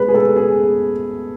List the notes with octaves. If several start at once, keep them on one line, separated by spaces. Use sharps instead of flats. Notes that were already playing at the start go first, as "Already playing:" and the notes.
Already playing: B2 G#3 B3 B4
G#4
A4
G#4